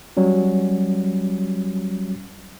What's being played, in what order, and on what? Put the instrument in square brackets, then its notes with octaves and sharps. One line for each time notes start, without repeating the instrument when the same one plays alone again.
[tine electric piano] F#3 G3 C#4